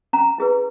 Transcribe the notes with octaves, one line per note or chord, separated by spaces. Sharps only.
C#4 A#5
E4 G#4 B4